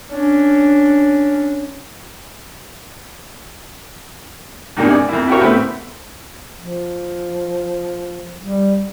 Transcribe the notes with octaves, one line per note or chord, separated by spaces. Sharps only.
C#4 D4
E2 G#2 C3 A#3 D4 D#4
D5 G#5
F2 A#3 E4
E4 F#4 G4 A#4 C#5
A1 A2 B3 C4 E5 B5
F3
G3